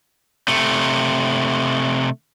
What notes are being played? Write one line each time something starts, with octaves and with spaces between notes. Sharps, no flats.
C3 A3